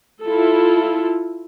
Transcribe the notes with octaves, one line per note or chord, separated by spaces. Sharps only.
E4 F4 A4